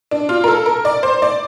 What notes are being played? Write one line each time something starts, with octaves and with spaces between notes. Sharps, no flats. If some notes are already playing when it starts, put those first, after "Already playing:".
D4
F4
A#4
A4
A#4
D5
C5
D5